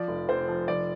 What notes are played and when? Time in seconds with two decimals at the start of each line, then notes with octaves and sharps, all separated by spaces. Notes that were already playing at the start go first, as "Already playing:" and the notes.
Already playing: F3 D5
0.08 F1
0.28 F1 C5
0.48 F3
0.68 F1 D5